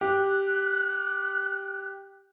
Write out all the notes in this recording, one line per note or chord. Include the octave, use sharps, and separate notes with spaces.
G4 F#6